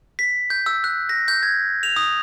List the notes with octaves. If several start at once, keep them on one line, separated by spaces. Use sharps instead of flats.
B6
G6
E6
F#6
A#6
G6
G#6
F7
D#6